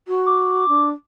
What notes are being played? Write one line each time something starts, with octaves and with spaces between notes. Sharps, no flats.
F#4
D6
D4